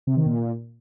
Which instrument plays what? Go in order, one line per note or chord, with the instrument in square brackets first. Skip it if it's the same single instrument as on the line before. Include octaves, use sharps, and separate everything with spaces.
[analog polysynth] C3
D#3
A#2